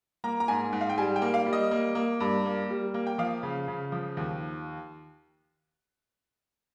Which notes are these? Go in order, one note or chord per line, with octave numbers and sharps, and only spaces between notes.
A#3 A#5
A#5
G#2 G#5
G#2
F5
G5
G3 G#5
G5
A#3
F5
G3
D#5
A#3
A#3
G2
A#3
G3
A#3
G5
F3 F5
C#3
C#3
F3
D#2